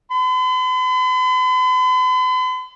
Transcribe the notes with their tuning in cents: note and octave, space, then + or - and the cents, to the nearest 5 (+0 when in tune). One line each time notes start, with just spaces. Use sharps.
B5 +45